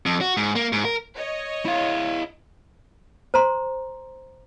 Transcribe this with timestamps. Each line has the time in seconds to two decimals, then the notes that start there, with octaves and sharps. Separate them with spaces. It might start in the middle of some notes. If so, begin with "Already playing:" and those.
0.06 F2
0.21 F#4
0.37 G#2
0.55 A#3
0.72 G#2
0.85 A#4
1.14 C#5 D#5
1.65 E4 F5
3.34 C5 A#5 C6